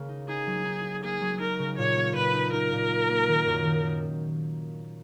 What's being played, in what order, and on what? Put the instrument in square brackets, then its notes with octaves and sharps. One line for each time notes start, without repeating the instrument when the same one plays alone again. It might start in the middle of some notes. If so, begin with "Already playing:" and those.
Already playing: [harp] C#3 A#3
D#4
[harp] D#4 [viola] G#4
[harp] F#3
D#4
D#4
[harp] A#3 [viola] G#4
[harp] F#3
[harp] D#4 [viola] A#4
[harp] C#3
[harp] A#2 [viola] C#5
[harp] A#3
[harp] A#2 [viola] B4
[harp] D#4
[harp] D#4 [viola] A#4
[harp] A#2
A#3
A#3
D#3
F#2
D#3
D#3